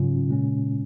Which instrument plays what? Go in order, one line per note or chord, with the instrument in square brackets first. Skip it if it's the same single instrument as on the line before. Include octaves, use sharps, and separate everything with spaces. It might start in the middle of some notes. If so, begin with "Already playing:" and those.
Already playing: [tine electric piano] G#2 F#3 C#4 F4 [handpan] C#3
[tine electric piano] A#2 G#3 C#4